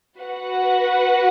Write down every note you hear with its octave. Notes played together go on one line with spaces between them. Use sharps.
F#4 B4 F#5